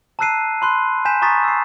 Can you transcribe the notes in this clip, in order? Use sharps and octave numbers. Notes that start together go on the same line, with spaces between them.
A5 A#5 E6 F#6 C7 D#7
B5 C6 F#6
G#5 G6 B6 E7
A#5 C#6 D#6 A6 B6
E6 C7